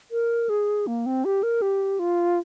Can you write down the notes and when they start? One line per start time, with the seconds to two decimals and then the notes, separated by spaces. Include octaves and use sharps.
0.11 A#4
0.49 G#4
0.87 A#3
1.06 C4
1.25 G4
1.43 A#4
1.62 G4
1.99 F4